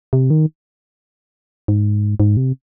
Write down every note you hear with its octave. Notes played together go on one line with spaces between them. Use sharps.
C3
D#3
G#2
G#2
C3